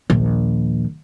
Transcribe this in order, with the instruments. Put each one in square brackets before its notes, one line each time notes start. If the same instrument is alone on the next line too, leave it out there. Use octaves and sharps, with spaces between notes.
[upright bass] A#1 D#2